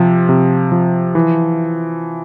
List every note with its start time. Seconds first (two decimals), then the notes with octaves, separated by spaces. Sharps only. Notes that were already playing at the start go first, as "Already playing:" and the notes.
Already playing: C3 F3
0.29 C3
0.72 F3
1.15 E3